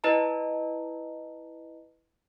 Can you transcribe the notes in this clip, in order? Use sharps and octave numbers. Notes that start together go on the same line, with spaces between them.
E4 B4 D#5 A5 A#5